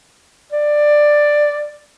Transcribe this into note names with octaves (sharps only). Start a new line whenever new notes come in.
D5